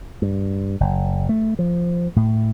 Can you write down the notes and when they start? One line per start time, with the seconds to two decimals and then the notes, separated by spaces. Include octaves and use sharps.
0.22 G2
0.80 F#1
1.29 A3
1.59 F3
2.16 A2